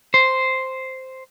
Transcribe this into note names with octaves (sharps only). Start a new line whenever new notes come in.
C5